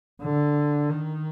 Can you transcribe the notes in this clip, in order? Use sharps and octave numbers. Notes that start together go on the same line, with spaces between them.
D3
D#3